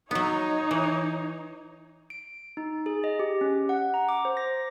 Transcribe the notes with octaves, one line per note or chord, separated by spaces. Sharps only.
F#3 B3 D#4 C#5
E3
D7
D#4
G#4
D#5
G4
C#4
F#5
A#5
D6
C5
A#6